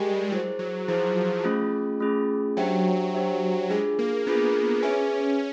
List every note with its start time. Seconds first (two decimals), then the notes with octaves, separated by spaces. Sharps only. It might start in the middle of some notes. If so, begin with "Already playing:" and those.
Already playing: G3 G#3 G4 A#4 D#5 G#5
0.32 F#3 E4 G#4 C5
0.59 F#3
0.88 F3 E4 G#4 C5
1.44 A3 C#4 F4 G#4
2.00 A3 C#4 F4 G#4
2.57 F#3 D4 G4 C5 E5 G5
3.14 D4 G4 C5 E5 G5
3.69 G#3 D4 F4 G#4
3.99 A#3
4.26 B3 D4 F4 G#4
4.83 C#4 G#4 B4 E5 G#5